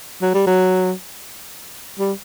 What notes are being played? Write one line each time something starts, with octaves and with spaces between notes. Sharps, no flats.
F#3
G3
F#3
G3